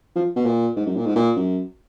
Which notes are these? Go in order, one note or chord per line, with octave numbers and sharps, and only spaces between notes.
F3
B2
A#2
G#2
F#2
A#2
G#2
A#2
F#2